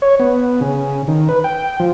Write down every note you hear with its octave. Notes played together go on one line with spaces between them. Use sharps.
C#5
B3
C#3
D#3
B4
G5
F3